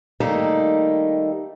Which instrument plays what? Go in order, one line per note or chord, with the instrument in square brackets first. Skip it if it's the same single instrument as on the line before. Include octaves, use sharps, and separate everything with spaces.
[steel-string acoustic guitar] D#3 G3 A3 A#3 D#4 A4